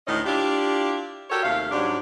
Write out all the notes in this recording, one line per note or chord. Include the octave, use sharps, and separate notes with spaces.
D2 A2 D#3 C#4 D#4 D#5
D4 E4 F4 G4
F#4 G4 A4 A#4 C#5
D#2 C3 A3 F5
G#2 F#3 G3 C#4 D4